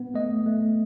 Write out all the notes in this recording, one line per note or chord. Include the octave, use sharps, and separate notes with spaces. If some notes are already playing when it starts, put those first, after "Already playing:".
Already playing: B3
A3 D#5
A3